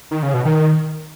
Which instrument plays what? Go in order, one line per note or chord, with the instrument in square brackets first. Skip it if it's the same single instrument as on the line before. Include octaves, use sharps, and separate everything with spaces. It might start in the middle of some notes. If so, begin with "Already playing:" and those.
[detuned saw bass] D#3
C#3
B2
D#3